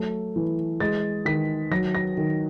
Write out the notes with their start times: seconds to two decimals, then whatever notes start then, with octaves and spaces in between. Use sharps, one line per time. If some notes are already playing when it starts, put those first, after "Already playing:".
Already playing: F#3 A3
0.36 E3
0.80 G#3 A6
1.25 D#3 B6
1.71 F#3 A#6
1.95 A#6
2.17 D#3